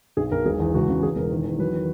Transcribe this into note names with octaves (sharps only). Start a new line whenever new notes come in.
B1 G#4
B1 A#4
E1 G#4
E2
C#2 F#4
C#3
E2 G#4
E1 A#4
D#3
E2
F#3 B4
D#3